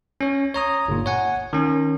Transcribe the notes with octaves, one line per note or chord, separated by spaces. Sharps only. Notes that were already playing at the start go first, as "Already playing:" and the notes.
C#4 C#5
C#5 A#5 D#6
G1 A#2
C#5 F#5 G#5
D#3 C#4